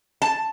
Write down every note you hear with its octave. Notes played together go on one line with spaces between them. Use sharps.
A5